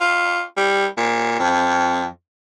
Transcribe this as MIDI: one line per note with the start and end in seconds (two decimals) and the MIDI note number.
0.01 0.42 65
0.57 0.86 55
0.97 1.37 46
1.39 2.07 41